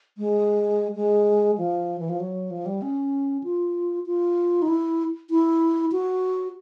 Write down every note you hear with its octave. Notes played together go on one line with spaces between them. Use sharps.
G#3
G#3
F3
E3
F3
F#3
F3
G3
C#4
F4
F4
D#4
E4
E4
F#4